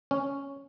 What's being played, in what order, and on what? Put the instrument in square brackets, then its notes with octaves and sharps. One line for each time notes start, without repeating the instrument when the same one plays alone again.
[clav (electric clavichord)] C#4